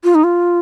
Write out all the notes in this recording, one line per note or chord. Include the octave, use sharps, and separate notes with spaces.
F4
D#4
F4